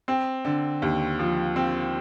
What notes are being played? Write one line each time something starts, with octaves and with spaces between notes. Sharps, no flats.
C4
D3
D#2
F3
C4